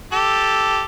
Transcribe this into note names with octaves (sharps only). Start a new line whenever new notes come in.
G4 A4